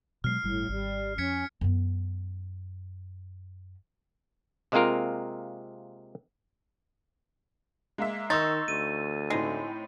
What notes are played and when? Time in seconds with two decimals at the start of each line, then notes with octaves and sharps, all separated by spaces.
0.24 B2 F#3 G#3 F6 C7
0.44 G1 A2 G3
0.69 G#1 G3
1.18 F2 C#4 G#6 B6 C#7
1.61 F#2 B3
4.72 C3 G#3 A#3 C4 F4 A#4
7.98 G#3 A#3 E5
8.30 D#3 D#4 C6 C#6 E6 A6
8.68 D2 D#7
9.30 A2 G#3 C4 D#4